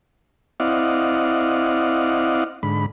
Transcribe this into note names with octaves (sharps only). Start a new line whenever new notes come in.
C4 E4 D5 D#5 F5 F#5
G#2 D3 B5